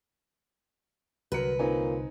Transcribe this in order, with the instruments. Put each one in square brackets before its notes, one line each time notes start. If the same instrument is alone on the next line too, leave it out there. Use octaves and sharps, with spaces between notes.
[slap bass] C2 D3 [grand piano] F#3 A#4 C#7 [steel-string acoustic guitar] B4
[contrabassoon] A#2 [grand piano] C4 D#4 G#5